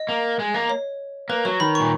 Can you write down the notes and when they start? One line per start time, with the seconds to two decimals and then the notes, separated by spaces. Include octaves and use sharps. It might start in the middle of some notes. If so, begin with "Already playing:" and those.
Already playing: D#5
0.09 A#3
0.39 G#3
0.54 A#3
0.70 C#5
1.29 A#3 B4
1.45 F#3 C#5
1.60 D#3 B5
1.75 A#2 C#6